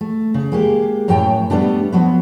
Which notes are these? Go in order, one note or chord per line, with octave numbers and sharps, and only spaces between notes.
A3
C#3
G#3 A#3 G4
F#2 A2 F#3 C#5 G5 A5
G3 A3 B3 D4 G4
F3 F#3 B3